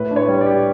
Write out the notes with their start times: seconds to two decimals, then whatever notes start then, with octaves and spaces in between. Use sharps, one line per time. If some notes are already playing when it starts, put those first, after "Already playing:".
Already playing: A2 B4
0.11 D4
0.16 C#5
0.28 G3
0.41 D5
0.46 G4